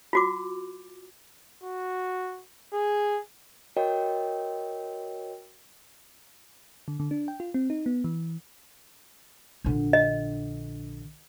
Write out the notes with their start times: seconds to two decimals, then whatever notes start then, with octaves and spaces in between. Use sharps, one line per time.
0.13 F4 F#4 D6
1.63 F#4
2.73 G#4
3.76 F#4 A#4 C#5 D#5 G5
6.88 D3
7.00 D3
7.11 D4
7.28 G5
7.40 F4
7.54 C4
7.70 D#4
7.86 B3
8.04 E3
9.65 A#1 D3
9.93 D#5